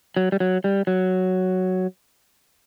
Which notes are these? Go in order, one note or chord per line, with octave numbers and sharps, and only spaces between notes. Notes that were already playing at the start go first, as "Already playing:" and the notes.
F#3
G3
F#3
G3
F#3